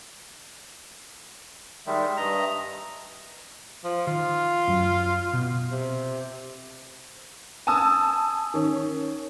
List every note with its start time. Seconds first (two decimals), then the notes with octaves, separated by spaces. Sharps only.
1.87 D#3 G3 G#3 E5
2.17 G2 D#5 A#5
3.84 F3
4.07 D#3 F4
4.67 F#2 F#3
5.33 B2
5.72 C3
7.67 G#5 A5 D#6 E6
8.54 D#3 C#4